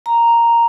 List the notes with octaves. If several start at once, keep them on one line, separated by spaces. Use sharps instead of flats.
A#5